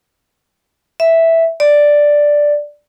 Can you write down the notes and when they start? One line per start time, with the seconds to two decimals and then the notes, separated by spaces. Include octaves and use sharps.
1.00 E5
1.60 D5